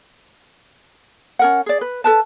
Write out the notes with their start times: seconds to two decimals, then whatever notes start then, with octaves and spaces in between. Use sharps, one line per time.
1.39 C#4 A#4 F#5
1.66 G#4 D5
1.81 B4
2.04 A4 B4 A5